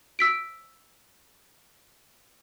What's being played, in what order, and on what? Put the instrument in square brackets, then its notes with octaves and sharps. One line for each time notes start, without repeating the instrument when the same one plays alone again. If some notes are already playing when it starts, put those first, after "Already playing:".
[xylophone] E6 B6 D7